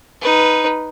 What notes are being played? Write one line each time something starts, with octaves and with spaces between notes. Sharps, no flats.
D#4 B4